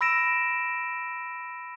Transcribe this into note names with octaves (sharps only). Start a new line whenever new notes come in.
B5 E6 A#6 D7 E7